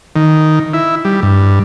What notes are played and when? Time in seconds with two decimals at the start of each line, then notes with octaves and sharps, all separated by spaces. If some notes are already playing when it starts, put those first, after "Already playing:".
0.16 D#3
0.74 E4
1.05 G3
1.23 G2